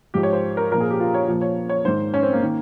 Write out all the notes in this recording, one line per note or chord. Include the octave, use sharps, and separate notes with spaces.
G#2 F3 G4
C#5
C5
A#4
A#2 F3 A#4
G#4
G4
F4
C#5
A#2 F3
C#5
C#5
G#2 D#3 C5
C#4
C4
A#3
D#3